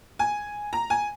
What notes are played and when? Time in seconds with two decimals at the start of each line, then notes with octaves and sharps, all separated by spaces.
0.19 G#5
0.73 A#5
0.90 G#5